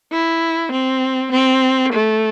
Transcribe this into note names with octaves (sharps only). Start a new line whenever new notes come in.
E4
C4
C4
A3